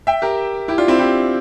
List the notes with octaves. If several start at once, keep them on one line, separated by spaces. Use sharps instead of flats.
E5 G5
G4 A#4
E4 G4
D4 F4
C4 E4
E4 G4